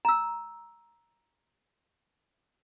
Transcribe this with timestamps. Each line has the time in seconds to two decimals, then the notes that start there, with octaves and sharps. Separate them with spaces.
0.05 A#5 E6